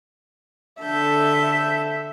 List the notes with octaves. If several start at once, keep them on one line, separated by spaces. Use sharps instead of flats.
D3 A4 E5 G6